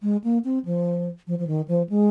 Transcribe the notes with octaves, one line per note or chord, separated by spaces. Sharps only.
G#3
A#3
C4
F3
F3
F3
D#3
F3
G#3